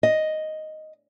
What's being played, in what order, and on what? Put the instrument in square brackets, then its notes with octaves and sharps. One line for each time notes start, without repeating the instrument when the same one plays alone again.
[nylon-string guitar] D#5